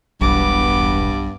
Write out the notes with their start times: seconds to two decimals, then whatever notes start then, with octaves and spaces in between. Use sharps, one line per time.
0.21 E1 B1 G2 B3 D6